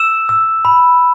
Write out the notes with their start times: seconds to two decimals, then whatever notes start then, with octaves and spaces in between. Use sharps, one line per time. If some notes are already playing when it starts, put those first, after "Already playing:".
Already playing: E6 E7
0.29 E6
0.65 B5